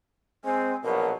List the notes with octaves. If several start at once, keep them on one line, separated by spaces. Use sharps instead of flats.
G#3 C4 G#5
A#1 B2 F#3 A#4